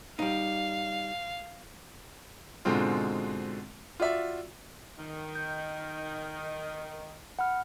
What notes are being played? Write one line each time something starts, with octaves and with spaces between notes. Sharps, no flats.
G3 D#4 F5
G#2 B2 D3 G#3 C4 F4
F4 F#4 D5 E5
D#3
G6
F#5 B5 F6